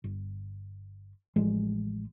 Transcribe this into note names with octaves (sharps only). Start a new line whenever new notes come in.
G1
A1 F3 G#3